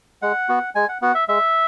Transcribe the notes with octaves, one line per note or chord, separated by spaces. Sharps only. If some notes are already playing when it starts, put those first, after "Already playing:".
G#3 F#5
B3 F#4
G#3 G#5
F#5
B3 F#4 F#5
E5
G#3 E5